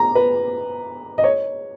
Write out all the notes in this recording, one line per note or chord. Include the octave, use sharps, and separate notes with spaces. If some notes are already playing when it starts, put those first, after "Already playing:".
Already playing: A#5
B4
D#5
C#5